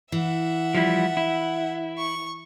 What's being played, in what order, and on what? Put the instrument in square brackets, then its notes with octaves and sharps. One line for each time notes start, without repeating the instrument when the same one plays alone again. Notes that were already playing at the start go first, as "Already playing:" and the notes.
[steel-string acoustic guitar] E3 [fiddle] E5 F#5
[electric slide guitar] F3 G3 E4
E4
[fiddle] C#6